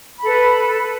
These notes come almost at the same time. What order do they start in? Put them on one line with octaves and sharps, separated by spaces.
B5 A4 B4